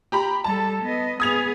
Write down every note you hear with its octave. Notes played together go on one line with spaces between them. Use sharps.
G4 A#5 B5
G3 A4 A5
B3 D#5
B3 G#4 D#6 G#6 F7